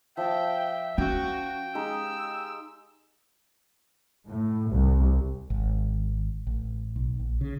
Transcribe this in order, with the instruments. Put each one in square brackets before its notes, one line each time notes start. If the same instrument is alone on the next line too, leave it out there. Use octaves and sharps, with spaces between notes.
[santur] F3 A5 [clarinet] E5 [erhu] G5
[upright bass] C#4 [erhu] F#4 [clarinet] G5
[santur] G#3 D#4 G4 [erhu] E6
[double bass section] A2
C2
[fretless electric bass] G#1
A1
B1
A#1
C#3